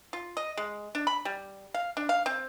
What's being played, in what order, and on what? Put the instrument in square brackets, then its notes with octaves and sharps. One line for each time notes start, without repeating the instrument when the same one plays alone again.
[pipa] F4
D#5
G#3
D4
B5
G3
F5
D4
F5
C4